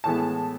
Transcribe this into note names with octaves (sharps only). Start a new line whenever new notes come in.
A2 E3 G#3 B3 A5